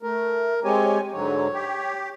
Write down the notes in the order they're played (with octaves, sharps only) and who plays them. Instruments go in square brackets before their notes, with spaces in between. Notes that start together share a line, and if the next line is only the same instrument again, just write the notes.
[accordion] A3 [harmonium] A#4
[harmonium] G#3 G4 [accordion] C4 C#5 G#5
[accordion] G#2 D3 F#3 [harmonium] C#5
[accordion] G4